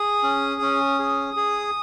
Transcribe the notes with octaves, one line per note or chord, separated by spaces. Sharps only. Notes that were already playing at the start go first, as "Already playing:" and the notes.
Already playing: G#4 D#6
C#4
C#4
G#4
G#4